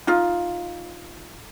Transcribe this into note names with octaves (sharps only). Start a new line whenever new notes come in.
D#4 F4